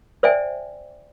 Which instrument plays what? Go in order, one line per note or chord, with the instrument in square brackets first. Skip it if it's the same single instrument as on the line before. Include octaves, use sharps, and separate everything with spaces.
[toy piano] C5 D5 E5 G5 G#5